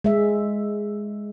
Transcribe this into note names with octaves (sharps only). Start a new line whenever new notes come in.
G#3 E5